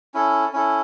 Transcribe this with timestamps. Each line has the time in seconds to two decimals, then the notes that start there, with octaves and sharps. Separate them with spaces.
0.14 C#4 E4 A4
0.53 C#4 E4 A4